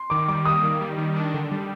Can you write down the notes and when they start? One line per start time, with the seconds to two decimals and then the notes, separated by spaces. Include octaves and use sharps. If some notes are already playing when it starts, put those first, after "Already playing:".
Already playing: C6
0.10 D#3 D6
0.28 G3 D6
0.45 A#3 D#6
0.63 D#3
0.81 G3
0.98 D#3
1.16 D4
1.34 D3
1.51 G3